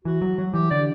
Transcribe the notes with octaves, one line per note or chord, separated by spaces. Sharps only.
E3 F#4
F#3
F#3
E3 G4
D3 D5